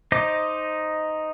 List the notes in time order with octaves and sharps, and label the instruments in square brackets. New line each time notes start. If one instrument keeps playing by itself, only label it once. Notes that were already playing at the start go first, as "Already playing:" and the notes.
[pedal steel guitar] D#4 C5 D#5 D6